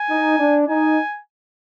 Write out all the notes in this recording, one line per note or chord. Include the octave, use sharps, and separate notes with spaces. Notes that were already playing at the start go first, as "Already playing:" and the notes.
Already playing: G#5
D#4
D4
D#4 G#5